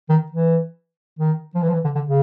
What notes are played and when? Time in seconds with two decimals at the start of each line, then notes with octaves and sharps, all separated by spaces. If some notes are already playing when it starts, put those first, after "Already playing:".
0.09 D#3
0.32 E3
1.19 D#3
1.55 F3
1.62 E3
1.69 F3
1.74 E3
1.84 D3
1.95 D3
2.07 C#3